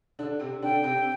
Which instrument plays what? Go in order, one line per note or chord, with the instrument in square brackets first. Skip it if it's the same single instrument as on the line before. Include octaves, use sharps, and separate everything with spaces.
[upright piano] D3 D4
C3 C4
[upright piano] D3 D4 [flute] G5
[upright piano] C3 C4